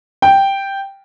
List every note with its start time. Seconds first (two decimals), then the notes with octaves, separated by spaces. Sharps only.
0.22 G5